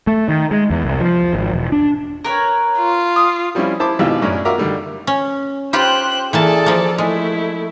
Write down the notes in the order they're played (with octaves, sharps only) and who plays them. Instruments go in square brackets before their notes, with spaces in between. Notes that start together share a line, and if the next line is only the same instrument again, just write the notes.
[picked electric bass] A3
D#3
G#3
E2
C2
F3
G#1
E1
D4
[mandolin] A#4 B4 C#5
[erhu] F4
[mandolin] D#6
[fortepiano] F3 G3 C4 C#4 E4 F4
E4 C5 A5 B5 D6
G#1 B2 E3 F4 G4 E6
F#2 A2 C#4 D4 E4
F4 F#4 A#4 E5 A#5 D6
D3 D#3 G3 A3
[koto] C#4
[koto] F4 G4 B4 [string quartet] C5 G5 F#6
[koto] E3 A#3 A5 [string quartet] G#4 A4 D5
[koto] F3 A#3
[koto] G#3 [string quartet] A3 E4